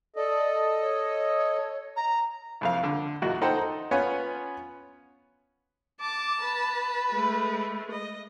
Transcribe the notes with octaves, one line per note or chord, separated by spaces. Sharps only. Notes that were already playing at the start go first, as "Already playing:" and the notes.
A4 D5 D#5
C#5
A#5
C2 F2 F5
D3
E2 A#2 F#4 D#5
D#4 A4 C5 F#5 G5 C6
D#4
B3 C#4 F4 C#5 F#5 G#5
A5 D6
B4
G#3 A3
D#5